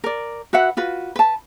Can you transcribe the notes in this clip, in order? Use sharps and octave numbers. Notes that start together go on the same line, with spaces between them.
A#4 D5
F#4 B4 E5 F#5
F4 F#4 B4
B4 A5